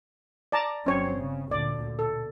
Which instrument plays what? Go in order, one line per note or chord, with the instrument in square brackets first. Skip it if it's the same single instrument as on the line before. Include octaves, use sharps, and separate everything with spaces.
[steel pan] D5 A5 A#5
[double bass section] G1 F#3 C4 [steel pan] C#4 C#5
[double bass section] C#3
[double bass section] D2 A#2 D3 [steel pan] D5
[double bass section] B2 [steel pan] A4